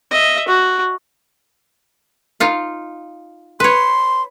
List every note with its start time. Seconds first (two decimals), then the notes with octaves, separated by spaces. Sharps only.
0.11 D#5 E5
0.48 F#4
2.40 D#4 F4 F5
3.60 B4 C#5 C6